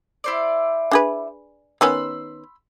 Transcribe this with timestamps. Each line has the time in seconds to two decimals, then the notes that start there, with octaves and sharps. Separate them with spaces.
0.24 E4 C5 D5
0.91 D4 G#4 B4
1.81 D#3 B3 C#4 B5 C6 E6